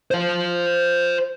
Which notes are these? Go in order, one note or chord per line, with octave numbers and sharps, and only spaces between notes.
C5 F5